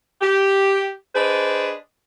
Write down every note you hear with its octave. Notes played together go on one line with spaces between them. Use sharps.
G4
D4 G#4 B4 C5 D#5